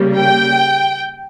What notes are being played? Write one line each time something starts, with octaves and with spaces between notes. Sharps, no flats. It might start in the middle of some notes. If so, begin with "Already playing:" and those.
Already playing: C#3 G3 A#3
G5